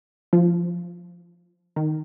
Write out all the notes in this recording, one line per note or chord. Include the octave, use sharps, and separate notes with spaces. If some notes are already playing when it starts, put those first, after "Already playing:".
F3
D#3